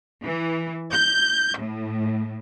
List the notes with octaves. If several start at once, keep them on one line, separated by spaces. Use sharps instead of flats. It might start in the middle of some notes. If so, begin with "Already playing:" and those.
E3
G6
A2